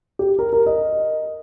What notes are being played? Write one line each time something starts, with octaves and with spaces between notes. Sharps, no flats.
G4
A#4
A#4
D#5